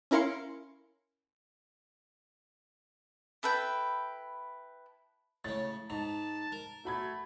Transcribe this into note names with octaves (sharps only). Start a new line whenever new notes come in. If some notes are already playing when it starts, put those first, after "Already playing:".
C#4 E4 A#4 F5 C6 C#7
E4 A4 B4 G5
A2 C#3 A6
G#2 A5 F7
A#4
A3 F#4 B5 G#6